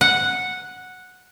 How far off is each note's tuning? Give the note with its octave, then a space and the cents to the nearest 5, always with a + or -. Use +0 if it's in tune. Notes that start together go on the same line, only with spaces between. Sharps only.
F#5 -5